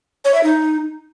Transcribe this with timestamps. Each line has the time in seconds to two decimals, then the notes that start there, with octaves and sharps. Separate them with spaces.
0.25 C#5
0.34 E5
0.43 D#4